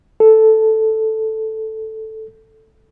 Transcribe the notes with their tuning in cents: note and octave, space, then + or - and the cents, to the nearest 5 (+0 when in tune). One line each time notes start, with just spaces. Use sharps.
A4 +0